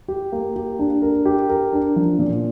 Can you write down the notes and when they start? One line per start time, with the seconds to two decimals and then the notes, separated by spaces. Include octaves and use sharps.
0.08 G4
0.32 A#3
0.56 G4
0.79 D4
1.02 A#4
1.25 G4
1.49 A#4
1.73 D4
1.96 F3
2.19 A#2